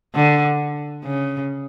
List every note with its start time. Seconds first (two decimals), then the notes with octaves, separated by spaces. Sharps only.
0.15 D3
1.05 C#3